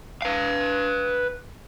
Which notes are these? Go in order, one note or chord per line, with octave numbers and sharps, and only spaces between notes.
B4 F5